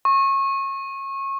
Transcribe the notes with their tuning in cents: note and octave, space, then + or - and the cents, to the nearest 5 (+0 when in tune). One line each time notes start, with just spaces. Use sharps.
C#6 -25